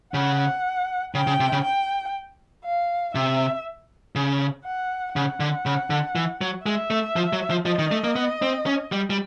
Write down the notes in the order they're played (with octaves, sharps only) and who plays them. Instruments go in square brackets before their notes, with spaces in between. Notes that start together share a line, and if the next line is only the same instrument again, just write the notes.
[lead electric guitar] C#3 [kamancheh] F#5
[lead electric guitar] C#3 [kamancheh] G5
[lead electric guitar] C#3
C3
C#3
[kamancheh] G5
F5
[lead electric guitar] C3 [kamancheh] E5
[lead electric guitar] C#3
[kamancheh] F#5
[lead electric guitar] C#3 [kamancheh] F#5
[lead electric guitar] D3
C#3
D3
E3
F#3
[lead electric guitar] G#3 [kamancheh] E5
[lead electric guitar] A3
F3
F#3
F3
[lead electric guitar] F3 [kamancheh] D#5
[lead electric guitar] D#3
A3
A#3
B3
C4
C#4
G3
G3